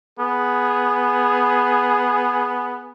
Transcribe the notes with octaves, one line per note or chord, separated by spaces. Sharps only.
B3 G#4